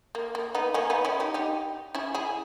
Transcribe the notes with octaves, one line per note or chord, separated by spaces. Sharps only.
A#3
A#3
B3 D#4
A#3 C#4
B3 D#4
C#4 E4
D#4 G4
D#4 G4
C#4 E4
E4 G#4